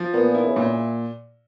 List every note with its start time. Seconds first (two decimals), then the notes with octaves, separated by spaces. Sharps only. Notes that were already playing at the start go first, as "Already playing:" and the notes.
Already playing: F3
0.13 A#2 B3
0.35 E4
0.45 C#3
0.56 A#2